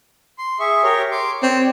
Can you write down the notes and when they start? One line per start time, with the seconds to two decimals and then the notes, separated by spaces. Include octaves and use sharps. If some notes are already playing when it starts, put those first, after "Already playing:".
0.38 C6
0.60 G#4 E5 C#6
0.83 G4 A#4 C#5
1.12 C6 D6
1.43 C4 C#5 D5